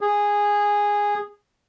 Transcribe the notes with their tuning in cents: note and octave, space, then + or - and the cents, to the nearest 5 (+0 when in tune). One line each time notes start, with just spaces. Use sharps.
G#4 -10